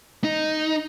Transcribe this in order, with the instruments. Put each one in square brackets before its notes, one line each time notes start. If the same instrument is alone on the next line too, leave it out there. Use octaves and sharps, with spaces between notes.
[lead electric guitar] D#4